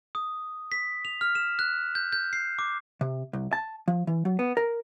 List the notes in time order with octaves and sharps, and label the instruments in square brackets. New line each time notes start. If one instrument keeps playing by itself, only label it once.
[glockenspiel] D#6
B6
F7
F6
E7
F#6
G6
G6
C7
D6
[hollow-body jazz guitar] C3
C2
A5
F3
E3
F#3
B3
A#4